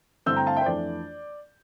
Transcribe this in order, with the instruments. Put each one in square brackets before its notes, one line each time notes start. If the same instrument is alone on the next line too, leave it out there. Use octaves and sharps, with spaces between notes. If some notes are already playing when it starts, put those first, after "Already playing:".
[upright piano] G2 D3 A3 C4 E4 E6 G6
G5 A#5
F5 A5
E5 G5
C5
F2 E3 A3 D4 D5